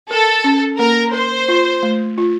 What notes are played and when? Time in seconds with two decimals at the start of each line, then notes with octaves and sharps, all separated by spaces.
0.10 A4 A#4
0.44 C#4
0.79 A#3 A#4
1.13 A#4 C5
1.48 F4
1.83 A3
2.18 F4